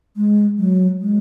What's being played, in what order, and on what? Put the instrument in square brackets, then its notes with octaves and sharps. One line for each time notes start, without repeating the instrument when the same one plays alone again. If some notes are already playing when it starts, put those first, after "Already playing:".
[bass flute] G#3
F#3
G#3